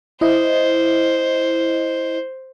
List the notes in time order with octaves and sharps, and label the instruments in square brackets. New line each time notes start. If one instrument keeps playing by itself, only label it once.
[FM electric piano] E4 D#5 [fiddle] C5